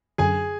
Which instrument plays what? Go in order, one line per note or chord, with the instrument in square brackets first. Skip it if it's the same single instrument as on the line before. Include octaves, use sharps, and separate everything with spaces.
[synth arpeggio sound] F#2 D3 F#3 [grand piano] G#4 G#5